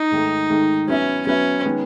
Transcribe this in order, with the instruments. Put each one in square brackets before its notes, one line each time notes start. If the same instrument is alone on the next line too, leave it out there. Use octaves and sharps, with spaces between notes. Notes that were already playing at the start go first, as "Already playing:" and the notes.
Already playing: [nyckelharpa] D#4
[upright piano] G#2 D#3 A3
G#2 D#3 A3
[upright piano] F#3 B3 E4 B4 E5 [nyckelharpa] C#4
[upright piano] F#3 B3 E4 B4 E5 [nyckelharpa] C#4
[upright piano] D#3 G#3 B3